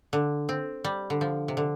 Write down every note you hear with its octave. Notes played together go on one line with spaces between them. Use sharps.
D3
C4
G3
D3
F3
C3
D3